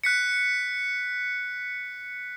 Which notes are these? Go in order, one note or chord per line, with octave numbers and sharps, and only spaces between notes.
F#6 B6 C#7